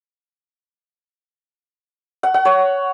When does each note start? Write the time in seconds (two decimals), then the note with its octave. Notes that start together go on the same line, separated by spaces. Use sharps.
2.23 F#5
2.34 F#5
2.45 C#5